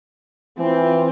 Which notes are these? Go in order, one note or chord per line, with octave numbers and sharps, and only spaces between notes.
E3 C4 F4